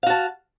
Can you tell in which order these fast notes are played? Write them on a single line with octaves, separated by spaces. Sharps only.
F5 F#4 A5